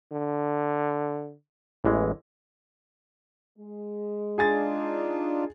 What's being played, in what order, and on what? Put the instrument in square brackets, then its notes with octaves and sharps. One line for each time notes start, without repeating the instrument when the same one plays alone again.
[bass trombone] D3
[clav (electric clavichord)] A1 E3 G#3 [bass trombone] E2
[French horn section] G#3
[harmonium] D4 D#4 F4 [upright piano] G#4 G#5 A6